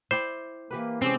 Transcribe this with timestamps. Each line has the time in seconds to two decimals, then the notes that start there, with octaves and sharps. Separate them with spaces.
0.11 E4 C5 D5 G5
0.71 E3 A#3 G4 B4
1.02 C3 G#3 C4 C#4 D5